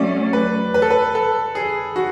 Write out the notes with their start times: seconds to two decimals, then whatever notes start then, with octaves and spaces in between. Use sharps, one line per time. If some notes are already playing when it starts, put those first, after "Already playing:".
Already playing: F#3 A3 C#4 D5
0.33 B4
0.74 B4
0.82 A4
0.90 B4
1.15 A4
1.55 G#4
1.96 F#4